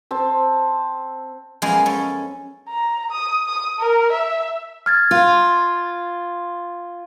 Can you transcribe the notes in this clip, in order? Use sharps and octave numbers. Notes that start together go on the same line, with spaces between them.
C4 A5
F#2 F3 G#3 B3 A#4 G#5
C#4 A4
A#5
D#6
D#6
A#4
E5
F6 G#6 A6
F4